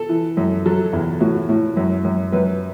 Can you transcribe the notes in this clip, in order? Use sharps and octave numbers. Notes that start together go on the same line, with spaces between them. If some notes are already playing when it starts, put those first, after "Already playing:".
Already playing: A4
E3
F#2
F#3 A4
E2
A2 F#4
A2
F#2
F#2
F#2 B4